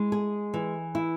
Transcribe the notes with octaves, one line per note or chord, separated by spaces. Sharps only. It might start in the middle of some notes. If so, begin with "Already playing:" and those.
Already playing: G#3 E4
G#4
E3
E4